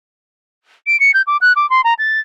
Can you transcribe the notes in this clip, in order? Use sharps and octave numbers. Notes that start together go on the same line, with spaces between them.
D7
C#7
G6
D6
F#6
D6
C6
A#5
A6